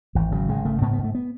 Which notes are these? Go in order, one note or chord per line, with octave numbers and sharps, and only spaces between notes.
G#1 E3
C#3 F#3
G#1 G#3
C#3 A3
G#2 B3
B3
G#2
A3
B3